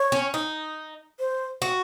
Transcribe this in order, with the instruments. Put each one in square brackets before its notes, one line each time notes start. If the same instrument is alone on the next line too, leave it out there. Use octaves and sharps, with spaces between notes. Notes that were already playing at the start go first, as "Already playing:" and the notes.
Already playing: [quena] C#5
[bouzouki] C#4
D#4
[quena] C5
[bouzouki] F#4